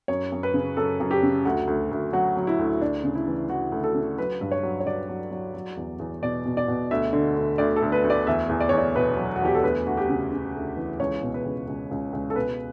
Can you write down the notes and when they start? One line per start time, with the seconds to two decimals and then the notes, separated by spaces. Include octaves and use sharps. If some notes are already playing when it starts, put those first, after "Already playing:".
0.08 F#2 C#5
0.32 F#2
0.43 B4
0.54 C#3
0.77 F#2 A4
1.00 F#2
1.11 G4
1.23 C#3
1.45 D2 F#4
1.67 D2
1.91 D2
2.13 F#3 F#4
2.37 F#3
2.47 E4
2.59 D2
2.81 D2 D4
3.04 C#3
3.15 E4
3.28 E3
3.49 E3 F#4
3.72 D2
3.84 A4
3.95 C#3
4.18 F#3 B4
4.41 G2
4.51 C#5
4.63 F#3
4.80 C#5
4.86 G2 D5
5.09 F#3
5.31 F#3
5.54 F#3
5.77 E2
5.99 E2
6.22 B2 D5
6.46 B2
6.57 D5
6.68 B2
6.91 D2 E5
7.13 D3
7.36 D2
7.58 D2 D5
7.76 A4
7.82 D2
7.92 B4
8.04 D2
8.10 D5
8.27 E2 E5
8.49 E2
8.60 D5
8.69 E2 C#5
8.78 D5
8.96 B2 B4
9.17 F#3
9.36 F#4
9.41 E2 G4
9.55 A4
9.64 D2 B4
9.86 D2 F#4
9.97 G4
10.09 C#3
10.31 C#3
10.55 D2
10.77 E3
10.99 C#2 C#5
11.22 B2
11.34 B4
11.45 C#2
11.68 C#2
11.91 C#2
12.13 C#2
12.30 A4
12.36 B2 B4